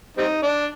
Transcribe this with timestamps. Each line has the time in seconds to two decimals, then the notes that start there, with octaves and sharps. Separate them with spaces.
0.17 G3 C4 D#4
0.43 D4